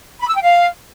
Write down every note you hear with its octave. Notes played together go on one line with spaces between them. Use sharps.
B5
E6
G5
F5